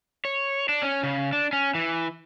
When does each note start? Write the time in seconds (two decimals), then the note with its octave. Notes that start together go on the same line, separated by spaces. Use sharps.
0.25 C#5
0.69 D4
0.83 C#4
1.03 C#3
1.33 D4
1.53 C#4
1.75 E3